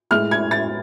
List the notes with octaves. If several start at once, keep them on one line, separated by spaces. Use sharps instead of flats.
A2 G#3 F6
G#6
A6